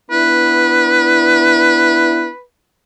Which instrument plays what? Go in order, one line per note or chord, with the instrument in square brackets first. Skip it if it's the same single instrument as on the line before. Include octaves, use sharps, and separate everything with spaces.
[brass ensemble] B3 D4 E4 [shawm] B4